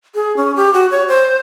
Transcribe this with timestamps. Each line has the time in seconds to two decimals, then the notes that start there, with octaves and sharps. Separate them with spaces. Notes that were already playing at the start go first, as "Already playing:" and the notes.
0.15 G#4
0.37 C#4
0.56 G4
0.73 F#4
0.91 C#5
1.08 C5